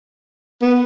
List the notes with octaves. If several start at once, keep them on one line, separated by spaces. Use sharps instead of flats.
B3